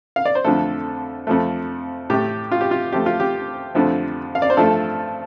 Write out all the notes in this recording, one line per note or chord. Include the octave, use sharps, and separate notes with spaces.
F5
D5
C5
F2 D3 F3 A3 A4
F2 F3 A3
A2 A3 G4
F4
G4
F4
F2 F3 A3 G4
F4
G4
F2 D3 F3 A3
F5
D5
C5
G2 F3 A3 A4